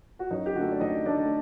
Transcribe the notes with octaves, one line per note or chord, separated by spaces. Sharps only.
F#4
F#2 D#4
G4
D3 A3 F#4
D5
F#2 D#4 D#5
D3 A3 D4 D5